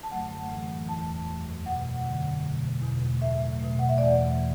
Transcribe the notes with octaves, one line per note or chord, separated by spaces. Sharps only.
A5
F#2 D3 F#3 A3 F#5
A2 E3 A3
E2 E3 A3 A5
F#2 F#3 A3
B2 F#3 A3 F#5
F#2 D3 A3
B2 F#3 A3
E2 B2 A3
A2 F#3 A3 E5
B2 A3
F#5
E5
E2 E3 A3 D5
E3